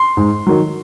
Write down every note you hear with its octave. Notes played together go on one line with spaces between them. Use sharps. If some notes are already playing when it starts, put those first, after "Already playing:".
Already playing: C6
G#2
D#3 F#3